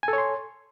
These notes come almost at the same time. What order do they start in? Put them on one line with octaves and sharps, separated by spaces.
G#5 A4 C#5 C6